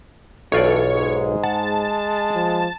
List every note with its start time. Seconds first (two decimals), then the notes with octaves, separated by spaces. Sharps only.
0.52 B1 E3 F4 A4 C#5 D5
0.91 G#2 G#3
1.44 F#5 A5
2.35 F3